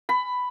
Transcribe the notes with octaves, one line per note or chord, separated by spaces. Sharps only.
B5